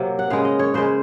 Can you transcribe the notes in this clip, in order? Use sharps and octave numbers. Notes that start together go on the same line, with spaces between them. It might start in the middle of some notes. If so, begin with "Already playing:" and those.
Already playing: C3 F#3 A#3
F#5
C#3 G#3 F5
D#5
C#5
C#3 G#3 C5